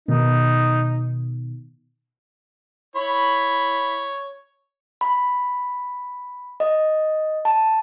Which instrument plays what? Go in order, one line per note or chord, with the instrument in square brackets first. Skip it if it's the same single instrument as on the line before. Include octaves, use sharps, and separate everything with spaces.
[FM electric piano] B2 D#3 [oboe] D#4
[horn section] E4 B5 [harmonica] C#5
[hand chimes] B5
D#5
A5